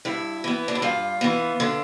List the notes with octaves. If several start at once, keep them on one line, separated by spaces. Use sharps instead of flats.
G2 E4
E3 B3
D4
E4
G2 F4
E3 B3
D3